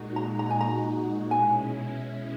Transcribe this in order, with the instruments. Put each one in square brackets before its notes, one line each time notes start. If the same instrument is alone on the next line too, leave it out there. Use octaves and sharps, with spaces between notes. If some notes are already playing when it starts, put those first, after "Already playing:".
Already playing: [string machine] A#2 G#3 D#4 F#4
[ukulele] A#5
A#5
G#5
A#5
[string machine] B2 G#3 C#4 E4 [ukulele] G#5